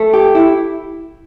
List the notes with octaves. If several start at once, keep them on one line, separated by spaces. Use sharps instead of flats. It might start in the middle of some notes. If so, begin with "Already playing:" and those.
Already playing: A3
G4
E4